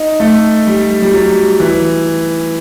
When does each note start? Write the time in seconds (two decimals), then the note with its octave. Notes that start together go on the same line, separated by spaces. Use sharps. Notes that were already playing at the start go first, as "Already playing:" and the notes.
Already playing: D#4
0.20 A3
0.67 G3
1.02 G3
1.13 F#3
1.59 E3